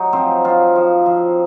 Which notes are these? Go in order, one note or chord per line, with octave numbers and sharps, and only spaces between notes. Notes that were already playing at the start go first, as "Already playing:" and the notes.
Already playing: F#3 D#4
F3 C4
F3 F4
F3
F3